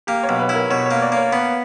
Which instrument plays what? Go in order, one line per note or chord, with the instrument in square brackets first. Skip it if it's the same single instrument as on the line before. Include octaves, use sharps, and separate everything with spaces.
[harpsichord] A#3 [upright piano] G4
[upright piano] C#5
[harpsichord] B1
[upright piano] B4
[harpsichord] E4 [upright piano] A#4
[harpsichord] B2 [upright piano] C#5
[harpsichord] A#3 [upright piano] C#5
[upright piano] D5
[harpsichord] A#3 [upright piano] C#5
[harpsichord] B3 [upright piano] B4